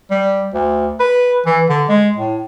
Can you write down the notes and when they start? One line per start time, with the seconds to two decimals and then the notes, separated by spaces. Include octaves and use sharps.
0.11 G3
0.54 D2
1.00 B4
1.46 E3
1.69 D3
1.88 G#3
2.16 A2